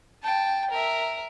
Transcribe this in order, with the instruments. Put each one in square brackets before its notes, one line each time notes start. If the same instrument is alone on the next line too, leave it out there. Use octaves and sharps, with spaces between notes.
[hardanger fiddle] G5 A5
A#4 E5